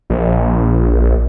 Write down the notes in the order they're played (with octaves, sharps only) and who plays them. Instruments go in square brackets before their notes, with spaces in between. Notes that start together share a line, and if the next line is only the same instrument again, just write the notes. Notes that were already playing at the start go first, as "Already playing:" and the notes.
[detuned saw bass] A#1